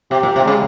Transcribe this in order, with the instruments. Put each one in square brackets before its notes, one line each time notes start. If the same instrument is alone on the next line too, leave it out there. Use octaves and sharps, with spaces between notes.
[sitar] C3 [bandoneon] G4
[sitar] A#2
[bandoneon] G4
[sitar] C3
[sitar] C#3 [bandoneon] G#3